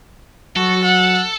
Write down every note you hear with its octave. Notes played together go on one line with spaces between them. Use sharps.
F#3 F#4 A4
F#5